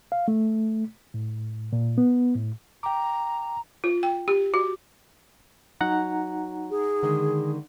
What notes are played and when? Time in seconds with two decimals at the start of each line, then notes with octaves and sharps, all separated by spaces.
0.12 F5
0.28 A3
1.14 A2
1.73 A#2
1.98 B3
2.36 A2
2.83 G5 A#5 D6
3.84 F4
4.03 G5
4.28 G4
4.54 F#4
5.81 F#3 D#4 F#5 A#5
6.71 G#4
7.03 D3 D#3 G#3